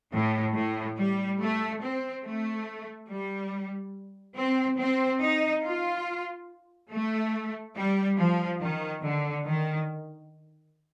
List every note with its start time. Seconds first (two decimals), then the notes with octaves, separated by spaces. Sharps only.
0.13 A2
0.55 A2
0.97 G3
1.40 A3
1.82 C4
2.24 A3
3.09 G3
4.37 C4
4.78 C4
5.21 D#4
5.64 F4
6.91 A3
7.75 G3
8.18 F3
8.60 D#3
9.03 D3
9.46 D#3